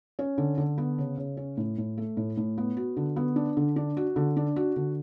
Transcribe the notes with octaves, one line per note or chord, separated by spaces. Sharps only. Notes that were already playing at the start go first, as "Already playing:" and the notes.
C#4
D3
D3
B3
C#3
C#3
C#4
A2
A2
A3
A2
A2
B3
F#4
D3
B3
D4
D3
D4
F#4
D3
D4
F#4
D3